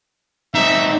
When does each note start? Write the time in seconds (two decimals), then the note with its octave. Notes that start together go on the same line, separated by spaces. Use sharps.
0.54 C4 D#4 E5